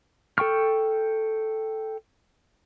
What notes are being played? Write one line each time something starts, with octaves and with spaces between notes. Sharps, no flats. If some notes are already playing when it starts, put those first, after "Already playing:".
A4 G5 C#6 F6